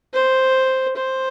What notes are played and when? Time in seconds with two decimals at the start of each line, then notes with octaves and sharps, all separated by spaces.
0.13 C5
0.96 C5